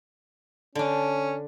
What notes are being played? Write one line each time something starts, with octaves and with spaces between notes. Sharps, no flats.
D3 C#4 D4